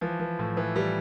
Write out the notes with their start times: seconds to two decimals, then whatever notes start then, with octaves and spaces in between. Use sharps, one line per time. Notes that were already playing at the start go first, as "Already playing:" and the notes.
0.01 E3 F3
0.20 E3
0.39 A2
0.57 E3
0.75 E3 G3